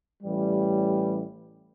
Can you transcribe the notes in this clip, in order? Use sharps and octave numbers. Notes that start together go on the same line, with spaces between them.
A1 A2 E3 G3